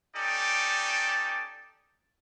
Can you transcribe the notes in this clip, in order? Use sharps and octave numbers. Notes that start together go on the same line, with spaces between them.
C#4 D#4 G4 A4 D5